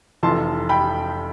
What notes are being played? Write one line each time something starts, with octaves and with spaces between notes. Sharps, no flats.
F1 F2 E3 A5 C6
G5 B5